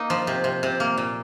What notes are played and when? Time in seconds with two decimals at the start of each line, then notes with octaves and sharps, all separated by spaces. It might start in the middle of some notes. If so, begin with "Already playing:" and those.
Already playing: A#3 D#4
0.10 F3
0.27 C3
0.44 C3
0.63 C3
0.80 A#3
0.97 A#2